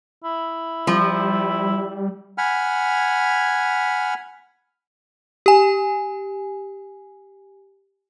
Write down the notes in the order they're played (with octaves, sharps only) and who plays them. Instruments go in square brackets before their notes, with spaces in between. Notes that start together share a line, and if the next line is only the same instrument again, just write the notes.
[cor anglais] E4
[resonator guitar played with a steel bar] F3 [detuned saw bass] G3
[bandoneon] F#5 G#5 B5 F6
[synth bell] G4 G#5